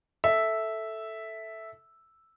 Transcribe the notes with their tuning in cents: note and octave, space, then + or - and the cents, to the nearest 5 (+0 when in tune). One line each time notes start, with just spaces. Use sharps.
A4 +0 E5 -5